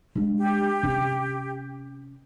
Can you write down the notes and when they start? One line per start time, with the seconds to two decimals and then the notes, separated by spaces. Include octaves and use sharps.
0.15 G#3 D4
0.38 G4
0.83 C3 C#4